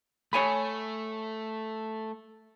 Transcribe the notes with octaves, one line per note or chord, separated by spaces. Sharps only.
A3 C#5 G#5 B5